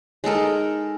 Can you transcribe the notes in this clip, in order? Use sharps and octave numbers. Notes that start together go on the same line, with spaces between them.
G#3 D#4 A4 A#4